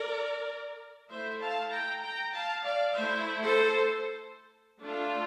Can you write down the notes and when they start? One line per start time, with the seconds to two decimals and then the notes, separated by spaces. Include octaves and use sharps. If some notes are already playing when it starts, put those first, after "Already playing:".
Already playing: A#4 D5
1.10 A3 E4 C5 E5
1.40 F5 A5
1.71 G5 A#5
2.02 G5 A#5
2.33 F5 A5
2.64 D5 F5
2.94 A3 E4 C5 E5
3.41 A4 C5
4.80 A3 D4 F4